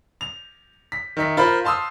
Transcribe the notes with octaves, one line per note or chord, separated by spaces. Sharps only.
F7
B6
D#3 E5 B6
F4 A#4 C5 B5
F5 A5 C6 D#6 E6